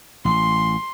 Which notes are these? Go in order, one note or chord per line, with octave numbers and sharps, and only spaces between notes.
A1 C6